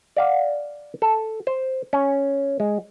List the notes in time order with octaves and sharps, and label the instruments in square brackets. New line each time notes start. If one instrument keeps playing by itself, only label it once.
[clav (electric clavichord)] D5 F5 F#5
A4
C5
C#4
G#3